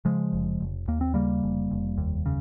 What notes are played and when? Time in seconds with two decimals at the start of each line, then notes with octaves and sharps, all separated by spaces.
0.05 C#3 F3 G#3
0.33 F1
0.61 F1
0.88 D#2 A#3
1.01 C4
1.14 C#3 G3 A#3
1.43 F1
1.71 F1
1.98 D#2
2.26 C#3